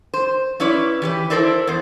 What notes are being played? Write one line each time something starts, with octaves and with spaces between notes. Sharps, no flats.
C5
C#4 E4 B4 C#5 D5
E3 G4 B4
E4 A4 A#4 C5 D5 E5
E2 C5